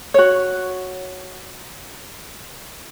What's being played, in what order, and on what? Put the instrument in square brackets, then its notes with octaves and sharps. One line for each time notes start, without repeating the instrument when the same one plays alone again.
[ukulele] F#4 C#5